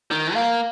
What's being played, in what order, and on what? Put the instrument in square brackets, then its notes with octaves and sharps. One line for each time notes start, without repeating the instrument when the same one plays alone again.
[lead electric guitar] D#3 [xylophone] G6
[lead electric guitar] A#3 [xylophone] F5